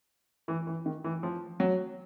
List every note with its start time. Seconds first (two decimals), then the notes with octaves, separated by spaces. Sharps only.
0.48 E3
0.67 E3
0.86 D#3
1.04 E3
1.23 F3
1.60 F#3